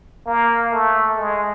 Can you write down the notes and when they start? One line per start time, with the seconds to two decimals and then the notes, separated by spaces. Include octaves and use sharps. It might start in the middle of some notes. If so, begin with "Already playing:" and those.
0.26 A#3
0.72 A3
1.17 G#3